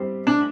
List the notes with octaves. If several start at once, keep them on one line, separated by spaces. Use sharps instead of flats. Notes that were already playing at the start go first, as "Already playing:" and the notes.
Already playing: G3 C4 G4 C5
A3 D4